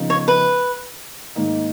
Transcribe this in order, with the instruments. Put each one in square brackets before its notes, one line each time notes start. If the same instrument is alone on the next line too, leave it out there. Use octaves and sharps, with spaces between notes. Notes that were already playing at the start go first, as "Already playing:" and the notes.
Already playing: [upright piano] C#3 F3 B3 D#4
[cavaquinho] C#5
B4
[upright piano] G#2 D#3 A#3 D#4